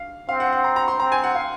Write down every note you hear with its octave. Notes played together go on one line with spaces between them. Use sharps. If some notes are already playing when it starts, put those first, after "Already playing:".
Already playing: F5
C4 F5
F#5
F#5
A#5
A#5
C6
C4 A#5
G#5
F#5
F5